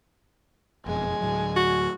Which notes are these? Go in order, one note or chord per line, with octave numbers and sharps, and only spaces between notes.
F#1 F2 B2 G#3 G#5
D2 A2 F#3
F#4